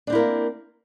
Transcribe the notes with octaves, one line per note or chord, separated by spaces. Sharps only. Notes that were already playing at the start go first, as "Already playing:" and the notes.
A#3 C4 D4 E4 A#4